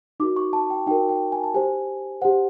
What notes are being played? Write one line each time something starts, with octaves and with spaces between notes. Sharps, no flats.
D#4 F#4 A#4 D6
C#6
A5
G5
D#4 F#4 A#4 G5
G5
G#5
A5
G4 C5 G#5
G4 C5 F#5